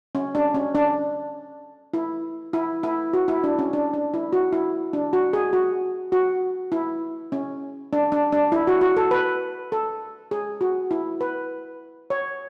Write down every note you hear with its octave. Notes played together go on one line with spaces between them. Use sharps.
C#4
D4
C#4
D4
E4
E4
E4
F#4
E4
D4
C#4
D4
D4
E4
F#4
E4
D4
F#4
G#4
F#4
F#4
E4
C#4
D4
D4
D4
E4
F#4
F#4
A4
B4
A4
G#4
F#4
E4
B4
C#5